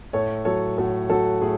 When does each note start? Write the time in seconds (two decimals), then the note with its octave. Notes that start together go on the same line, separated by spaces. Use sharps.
0.13 A2 A4 C#5
0.45 F#3 A4 C#5
0.78 A2 F#4 A4
1.10 F#3 F#4 A4
1.42 A2 G#4